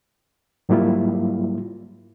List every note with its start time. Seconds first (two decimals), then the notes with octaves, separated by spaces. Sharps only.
0.69 G#2 F#3 G3 A#3 E4 F4